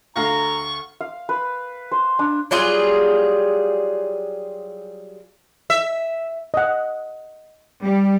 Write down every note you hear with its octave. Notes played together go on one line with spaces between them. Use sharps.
D2 F5 A#5 C#6 A#6
F5
B4
C5
D4
F#3 G3 F4 G#4
E5
D#5 F#5
G3